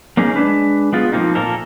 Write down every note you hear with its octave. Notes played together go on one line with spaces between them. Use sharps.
A#3 C#4 D#4 G#4
G#3 D4 B4
G#3 B3 F4
F3 F#3 A#3 C4 D#4
A#2 A#3 A4 A#4